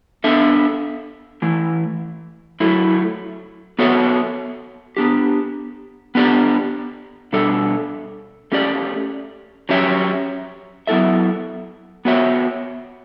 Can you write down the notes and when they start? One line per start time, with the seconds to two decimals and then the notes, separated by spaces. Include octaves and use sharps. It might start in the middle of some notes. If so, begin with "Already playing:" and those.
0.24 B3 D4 A4 E5
1.42 E3 A3 E4
2.60 F#3 A3 E4
3.79 B3 F#4 A4 C#5 E5
4.97 B3 D4 G4
6.15 B3 D4 G4 D5
7.33 B2 G3 D4 A4 E5
8.52 A3 C#4 G4 D5
9.69 F#3 C#4 G4 C#5 E5
10.87 F#3 B3 E4 A4 E5
12.05 B3 F#4 C#5 E5